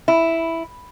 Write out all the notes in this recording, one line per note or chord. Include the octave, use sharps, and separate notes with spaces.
E4